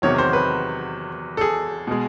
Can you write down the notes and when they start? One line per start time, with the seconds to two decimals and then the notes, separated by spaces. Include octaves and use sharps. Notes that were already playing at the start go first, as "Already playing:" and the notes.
0.02 E2 C3 D#3 F#3 C#5
0.18 C5
0.33 B4
1.37 A4
1.41 G#4
1.87 B2 G#3